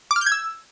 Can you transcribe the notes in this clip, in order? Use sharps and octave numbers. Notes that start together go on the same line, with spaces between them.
D6
F6
G6
G#6
E6